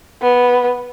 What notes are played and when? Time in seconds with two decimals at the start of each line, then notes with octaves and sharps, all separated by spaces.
0.22 B3